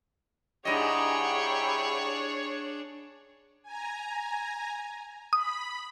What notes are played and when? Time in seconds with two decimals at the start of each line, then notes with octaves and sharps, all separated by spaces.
0.65 G#2 D4 E4 G4 G#4 C#5 D#5
3.62 G#5 A#5
5.33 B5 D#6